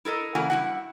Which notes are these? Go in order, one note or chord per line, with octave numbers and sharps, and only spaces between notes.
E4 A4 A#4 D#5
C#3 E3 A#3 F#4 G#5
G2 E4 F#5